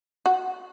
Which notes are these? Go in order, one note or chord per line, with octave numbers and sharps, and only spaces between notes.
F#4